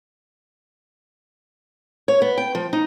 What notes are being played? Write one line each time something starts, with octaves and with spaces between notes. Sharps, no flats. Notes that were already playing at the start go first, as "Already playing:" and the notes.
C#5
B3
G5
F3
D#4